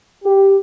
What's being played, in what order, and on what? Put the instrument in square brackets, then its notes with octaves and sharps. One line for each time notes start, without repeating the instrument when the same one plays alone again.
[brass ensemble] G4